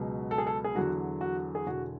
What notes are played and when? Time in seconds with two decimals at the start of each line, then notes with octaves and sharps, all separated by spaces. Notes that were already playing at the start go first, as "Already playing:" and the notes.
Already playing: C#2 B2 F#3
0.31 A4
0.38 G#4
0.47 A4
0.64 G#4
0.75 E2 D3 F#3 F#4
1.21 F#4
1.55 G#4
1.67 E1 E2 D3 F#4